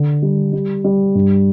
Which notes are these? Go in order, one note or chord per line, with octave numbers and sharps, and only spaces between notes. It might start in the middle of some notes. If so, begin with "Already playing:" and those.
Already playing: D3
G3
G3
G3
G2